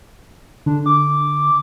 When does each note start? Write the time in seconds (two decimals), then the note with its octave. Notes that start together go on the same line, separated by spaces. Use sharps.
0.66 D3 D4
0.86 D6